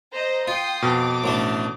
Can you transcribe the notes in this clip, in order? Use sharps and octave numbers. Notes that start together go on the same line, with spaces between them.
C5 D#5 A#5
F4 G5 C6 D#6
F2 B2 D6
A1 D3 A3